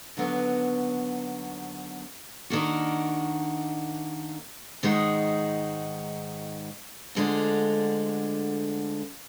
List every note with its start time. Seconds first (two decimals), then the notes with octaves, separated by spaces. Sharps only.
0.17 D#2 D3 F#3 B3
2.50 D#3 A#3 D4 F#4
4.83 G#2 D#3 G#3 D#4 F#4
7.15 D2 D3 G#3 D4 F4